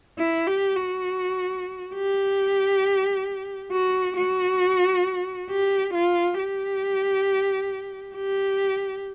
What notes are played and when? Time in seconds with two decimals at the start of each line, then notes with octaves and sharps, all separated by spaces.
0.18 E4
0.47 G4
0.76 F#4
1.95 G4
3.72 F#4
4.17 F#4
5.50 G4
5.95 F4
6.39 G4
8.15 G4